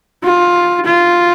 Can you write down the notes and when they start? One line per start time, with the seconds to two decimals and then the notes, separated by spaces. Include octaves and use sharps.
0.24 F4
0.86 F4